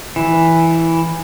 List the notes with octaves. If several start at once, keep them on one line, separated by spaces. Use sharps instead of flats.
E3